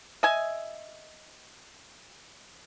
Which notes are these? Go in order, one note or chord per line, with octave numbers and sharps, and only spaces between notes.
D#5 E5 G#5